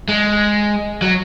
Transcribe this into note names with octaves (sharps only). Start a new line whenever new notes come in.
G#3
F#3